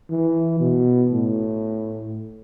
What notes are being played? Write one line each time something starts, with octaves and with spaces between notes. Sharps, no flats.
E3
B2
A2